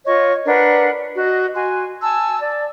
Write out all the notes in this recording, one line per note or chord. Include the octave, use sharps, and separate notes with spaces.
F4 C#5 D#5 C#6
D4 A#4 B4 F#5
F#4 D#5
F#4 G#5 C6
G#5 A5 E6
D5